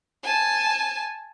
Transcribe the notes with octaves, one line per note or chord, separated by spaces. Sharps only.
G#5 A5